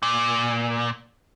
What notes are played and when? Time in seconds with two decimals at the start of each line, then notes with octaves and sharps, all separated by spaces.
0.03 A#2